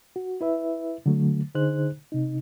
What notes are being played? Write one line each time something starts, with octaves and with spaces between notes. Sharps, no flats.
F#4
E4 B4 E5
D3 F#3 A3
D3 D#4 G#4 C5 F#6
C3 D#4